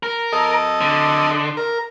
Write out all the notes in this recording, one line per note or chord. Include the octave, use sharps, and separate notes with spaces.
A#4
A4 D#5
D3
A#4